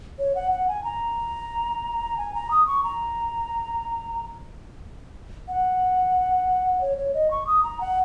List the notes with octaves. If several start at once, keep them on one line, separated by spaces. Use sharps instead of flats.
C#5
F#5
F#5
G#5
A#5
G#5
A#5
D#6
C#6
A#5
F#5
C#5
C#5
D#5
C#6
D#6
A#5
F#5